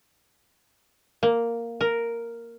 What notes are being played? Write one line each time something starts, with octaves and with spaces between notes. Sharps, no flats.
A#3
A#4